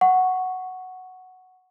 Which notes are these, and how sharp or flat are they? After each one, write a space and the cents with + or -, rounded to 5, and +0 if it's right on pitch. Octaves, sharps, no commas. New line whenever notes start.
F#5 +0 C#6 +0